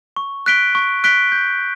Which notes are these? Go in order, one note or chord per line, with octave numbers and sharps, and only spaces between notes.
C#6
F#6 B6 D7 G7
C#6
F#6 B6 D7 G7
G6